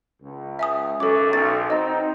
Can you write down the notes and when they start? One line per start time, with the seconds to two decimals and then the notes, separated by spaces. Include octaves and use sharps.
0.22 C#2
0.59 E5 G#5 D#6
1.00 B1 F#2 A4 D6
1.33 B1 A6
1.70 C4 D#4 D#5 A#5